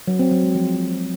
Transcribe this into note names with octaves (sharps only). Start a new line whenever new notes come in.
F#3
C4
F#3
G#3
F3